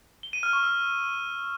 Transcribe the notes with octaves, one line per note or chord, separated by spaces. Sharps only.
G7
D#7
F6
C#6
E6